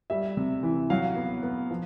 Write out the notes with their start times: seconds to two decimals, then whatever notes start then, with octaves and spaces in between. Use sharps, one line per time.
0.10 G3 E5
0.37 C3
0.63 E3
0.90 F#3 F5
1.16 B3
1.43 B3
1.71 F3